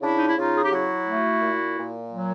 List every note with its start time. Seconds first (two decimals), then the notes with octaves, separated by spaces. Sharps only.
0.02 C#3 D4 E4
0.18 D#4
0.28 E4
0.37 C#3 D#4 F4
0.56 G#4
0.65 G4
0.71 F#3 E4 F#4
1.07 A3
1.42 A#2
1.77 A#2
2.12 F#3